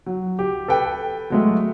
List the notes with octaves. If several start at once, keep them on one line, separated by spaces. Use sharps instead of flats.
F#3
G4
A4 B4 G5
F#3 G#3 A3